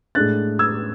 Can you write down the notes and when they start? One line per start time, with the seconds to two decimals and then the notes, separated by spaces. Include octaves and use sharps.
0.15 A2 G#3 D4 F#6 A6
0.59 E6 G#6